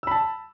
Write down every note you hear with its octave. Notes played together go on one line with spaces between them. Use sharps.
A5 B5 E6